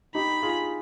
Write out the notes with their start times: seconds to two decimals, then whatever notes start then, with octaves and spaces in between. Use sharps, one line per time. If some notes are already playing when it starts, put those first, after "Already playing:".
0.15 D#4 G4 B5
0.43 F4 G#4